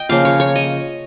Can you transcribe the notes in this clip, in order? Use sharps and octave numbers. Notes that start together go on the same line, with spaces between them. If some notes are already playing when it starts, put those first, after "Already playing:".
Already playing: D#5 G5
C#3 F3 A#3 F5
C#5
C#5
D#5